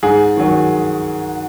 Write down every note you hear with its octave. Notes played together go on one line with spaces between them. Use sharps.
G#2 G#4
D#3 F#3